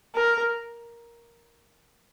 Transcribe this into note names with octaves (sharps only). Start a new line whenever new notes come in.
A#4